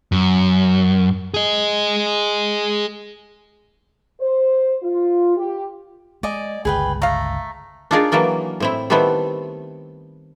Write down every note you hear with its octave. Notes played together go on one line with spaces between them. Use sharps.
F#2
G#4 D#5
C5
F4
G4
G#3 D5 D#5 G#5
G1 C#2 G#4 B4 G5
A3 F5 A#5
D4 D#4 F4 G#4 A#4 D5
E3 F#3 A#3 A#4 D5
A2 C4 E4
D#3 G3 A3 B3 C4 E4